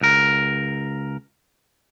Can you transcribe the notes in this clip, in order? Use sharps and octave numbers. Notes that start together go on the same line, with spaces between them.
C#2 A#4